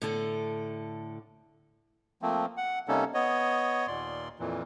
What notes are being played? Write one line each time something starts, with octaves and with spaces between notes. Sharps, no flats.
A2 D3 A4
F3 A3 A#3 C4
F#5
C3 G3 A#3 C#4 D#4 A4
B3 C#5 D#5
D#2 A#2 D5 C6
F2 A#2 E3